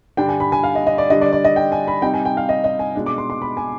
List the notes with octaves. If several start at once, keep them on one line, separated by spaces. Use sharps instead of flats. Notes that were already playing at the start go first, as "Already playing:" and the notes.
G2 D3 G3 D4 G5
G#5
B5
G#5
F5
D#5
D#5
D5
D3 G3 D4 D#5
D5
D5
D#5
G5
G#5
B5
C3 G3 C4 D#4 G5
G#5
G5
F5
D#5
D#5
G#5
B2 G#3 D4
D6
C6
C6
B5
G#5